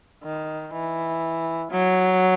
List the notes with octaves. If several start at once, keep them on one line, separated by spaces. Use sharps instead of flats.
D#3
E3
F#3